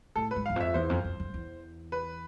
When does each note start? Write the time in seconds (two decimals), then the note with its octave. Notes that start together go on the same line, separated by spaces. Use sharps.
0.16 A2 A4
0.31 B4
0.36 G#2
0.46 E2 F5
0.56 F2 E5
0.74 E2 C5
0.89 F2
1.04 F2
1.20 F2
1.34 E2
1.92 B4